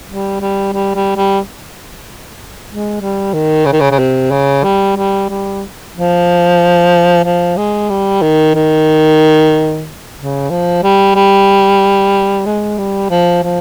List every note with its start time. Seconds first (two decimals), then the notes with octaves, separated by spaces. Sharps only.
0.08 G3
0.41 G3
0.73 G3
0.95 G3
1.17 G3
2.69 G#3
3.01 G3
3.34 D#3
3.66 C#3
3.73 D#3
3.80 C#3
3.91 C#3
3.99 C3
4.31 C#3
4.64 G3
4.97 G3
5.30 G3
5.95 F3
7.24 F3
7.57 G#3
7.90 G3
8.22 D#3
8.55 D#3
10.17 C#3
10.50 F3
10.83 G3
11.15 G3
12.46 G#3
12.78 G3
13.11 F3
13.43 F3